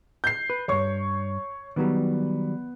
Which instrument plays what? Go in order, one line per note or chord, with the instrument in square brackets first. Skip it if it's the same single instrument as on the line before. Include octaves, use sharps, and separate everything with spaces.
[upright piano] G6 C7
[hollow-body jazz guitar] B4
[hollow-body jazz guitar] E2 G2 [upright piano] C#5 C#6
[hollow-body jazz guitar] D#3 F#3 G3 [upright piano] B3